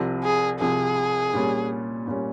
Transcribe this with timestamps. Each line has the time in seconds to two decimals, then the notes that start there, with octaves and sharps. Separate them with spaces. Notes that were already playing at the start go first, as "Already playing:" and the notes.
Already playing: C2 C3 F3
0.24 G#4
0.60 C2 C3 F3 G#4
1.34 A#2 G3 C#4
2.07 A#2 G3 C#4